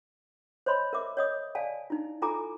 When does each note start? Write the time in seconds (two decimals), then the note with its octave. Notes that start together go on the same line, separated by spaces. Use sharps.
0.66 C5 C#5 D#5 B5 C6
0.93 A#4 E5 D6
1.17 C#5 D#5 D#6
1.55 D5 F5 G#5 A5
1.90 D#4 E4
2.22 E4 F4 A4 G#5 A#5 D6